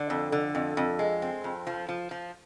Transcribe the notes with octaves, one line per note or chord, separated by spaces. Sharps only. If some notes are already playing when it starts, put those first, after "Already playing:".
Already playing: D3
F2
D3
F2
F2
G#3
C4
F2
F3
F3
F3